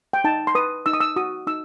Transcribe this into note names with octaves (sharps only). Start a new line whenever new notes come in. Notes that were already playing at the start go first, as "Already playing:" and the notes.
G5
D#4 A5
C6
B4 D#6
D#4 E6
D#6
E6
F#4 D#6
D#4 E6